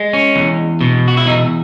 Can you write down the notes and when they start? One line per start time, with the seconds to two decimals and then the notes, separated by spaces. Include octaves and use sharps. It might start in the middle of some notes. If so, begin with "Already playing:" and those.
Already playing: G#3
0.13 C#4
0.36 E2
0.81 B2
1.08 F#4
1.17 E4
1.26 E2 D#4